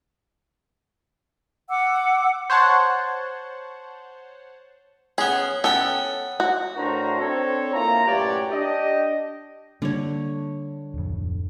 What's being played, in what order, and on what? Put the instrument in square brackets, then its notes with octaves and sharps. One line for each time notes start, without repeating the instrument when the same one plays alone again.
[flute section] F#5 D6 E6
[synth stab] C5 C#5 F#5 A5
[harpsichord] B3 G#4 [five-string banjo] C#4
[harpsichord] B3 G5 [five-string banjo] C#4 A4
[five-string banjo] F#4
[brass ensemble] A2 D4 F#4 A#4 C5 A#5
C4 D4 A4 C5 C#5
A#3 E4 F4 A#5
F#2 A2 G4 B4 C#5 D5
D4 G4 D#5
[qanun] D3 C#5 [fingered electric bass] G3 A#3
[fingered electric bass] D1 F2